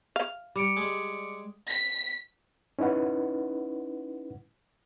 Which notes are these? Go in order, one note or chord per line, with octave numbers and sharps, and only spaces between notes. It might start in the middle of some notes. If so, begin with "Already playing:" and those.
F5
G3 D6 C#7 D7
G#3 D5 G#5
B6
C#4 D#4 E4 B4 F#5